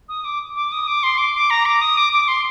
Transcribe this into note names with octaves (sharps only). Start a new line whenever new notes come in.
D#6
D6
D6
D#6
D6
C6
D6
D6
A#5
D6
D#6
D6
D6
C6